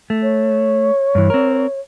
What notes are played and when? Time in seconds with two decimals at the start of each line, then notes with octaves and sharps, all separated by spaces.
0.10 A3
0.22 C#5
1.15 G2 E3
1.30 C4 A#4